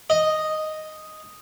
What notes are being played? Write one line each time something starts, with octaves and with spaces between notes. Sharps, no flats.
D#5